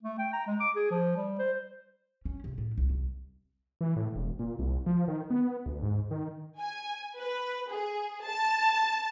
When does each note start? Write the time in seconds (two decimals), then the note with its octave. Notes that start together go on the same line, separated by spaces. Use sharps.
0.03 A3
0.19 G5
0.33 A#5
0.47 G#3
0.60 D6
0.76 G#4
0.91 F3
1.16 G3
1.39 C5
2.25 C#4
2.44 C3
2.58 A2
2.78 C2
2.90 C2
3.81 E3
3.96 A2
4.16 E1
4.39 A#2
4.59 C2
4.86 F3
5.08 D#3
5.30 B3
5.66 D2
5.83 G#2
6.11 D#3
6.60 G#5
7.16 B4
7.70 G#4
8.23 A5